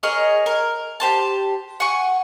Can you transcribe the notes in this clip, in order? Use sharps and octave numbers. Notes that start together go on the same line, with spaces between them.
G#4 A#4 C#5 D#5
A#4
G4 C5 A5
F#5 G#5 C#6